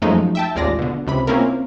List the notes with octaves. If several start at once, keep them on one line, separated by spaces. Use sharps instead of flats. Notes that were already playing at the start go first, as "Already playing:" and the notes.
F#2 F3 F#3 G#3 A3 D#4
E5 G5 A5
A1 D#2 G#3 F4 D5 A#6
B2 D3
C#2 C3 B5
A#3 C4 C#4 E4 F4 A#4